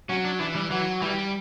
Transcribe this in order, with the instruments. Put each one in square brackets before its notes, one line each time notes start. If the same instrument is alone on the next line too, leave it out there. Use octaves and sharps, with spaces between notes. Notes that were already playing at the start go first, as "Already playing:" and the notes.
[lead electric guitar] F#3 [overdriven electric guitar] C#4
[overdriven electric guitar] D4
[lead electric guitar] E3 [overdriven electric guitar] D4
[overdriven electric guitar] G3
[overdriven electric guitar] E3 [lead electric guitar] F#3
[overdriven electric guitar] E3 [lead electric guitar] G3